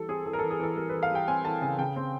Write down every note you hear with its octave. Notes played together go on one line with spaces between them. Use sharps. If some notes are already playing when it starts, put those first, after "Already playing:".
Already playing: E3 G3 A4
C4 G#4
E3 A4
A#4
E3 A4
G#4
E3 A4
G3 A#4
E3 B4
F5
G3 G5
C4 G#5
E3 A5
C#3 G#5
C#3 G5
C4